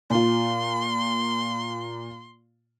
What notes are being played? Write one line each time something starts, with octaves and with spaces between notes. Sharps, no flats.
A#2 F4 C6